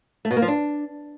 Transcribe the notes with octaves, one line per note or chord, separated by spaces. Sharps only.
A3
B2
A#3
F3
D4